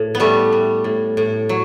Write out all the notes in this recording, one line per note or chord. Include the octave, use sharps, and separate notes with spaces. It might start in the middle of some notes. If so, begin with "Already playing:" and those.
Already playing: A2
B3
G3 A3
G3
A2
A2
F#3